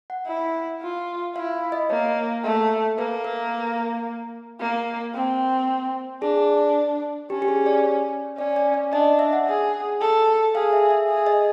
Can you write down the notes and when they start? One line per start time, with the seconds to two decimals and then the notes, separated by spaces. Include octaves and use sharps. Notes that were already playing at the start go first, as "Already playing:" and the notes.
0.10 F#5
0.27 E4
0.82 F4
1.36 E4 F5
1.72 D#5
1.89 A#3 C#5
2.44 A3
2.98 A#3 B4
3.24 A#4
4.60 A#3
5.14 C4
6.22 D4 G#4
7.30 C#4 G4
7.42 G4
7.48 G#4
7.66 D5
7.84 C#5
8.38 C#4 D5
8.56 D5
8.74 D5
8.92 D4 D#5
9.19 E5
9.33 F#5
9.46 G#4
10.01 A4
10.55 G#4 F5
10.73 E5
10.91 E5
11.09 G#4
11.27 D#5